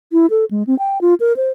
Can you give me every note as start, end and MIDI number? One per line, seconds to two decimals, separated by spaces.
0.12 0.26 64
0.30 0.45 69
0.51 0.63 56
0.67 0.77 60
0.79 0.98 79
1.01 1.14 65
1.20 1.33 70
1.37 1.50 72